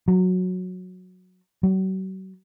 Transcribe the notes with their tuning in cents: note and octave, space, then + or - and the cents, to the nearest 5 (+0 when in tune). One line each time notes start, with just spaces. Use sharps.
F#3 -15
F#3 +40